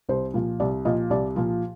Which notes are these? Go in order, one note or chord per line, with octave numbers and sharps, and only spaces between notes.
C2 C5
A#2 F3
C2 D5
A#2 F3 D#5
C2 D5
A#2 F3